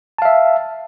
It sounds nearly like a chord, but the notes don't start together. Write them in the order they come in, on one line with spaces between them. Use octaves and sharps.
A5 F5 E5